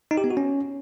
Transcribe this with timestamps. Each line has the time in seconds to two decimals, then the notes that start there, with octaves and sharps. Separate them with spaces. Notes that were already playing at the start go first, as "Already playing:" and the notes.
0.11 D#4
0.17 G4
0.24 B3
0.30 F#4
0.37 C#4